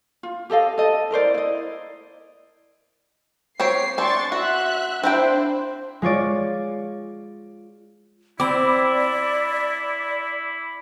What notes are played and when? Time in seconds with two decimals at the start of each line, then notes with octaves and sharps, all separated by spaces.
0.23 F4
0.50 G4 A4 D#5 F5
0.78 A4 D#5
1.11 E4 A#4 C5 D5
1.34 E4 D#5
3.60 C4 G4 C#5 C7
3.98 C4 D4 C6 C#6 A6
4.32 F#4 E5 F#6
5.04 C4 D4 E4 C5 G5
6.02 G#3 F4 C#5 D5
8.40 C4 E4 D5 B5 D6